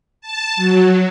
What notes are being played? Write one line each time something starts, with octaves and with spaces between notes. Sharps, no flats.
A5
F#3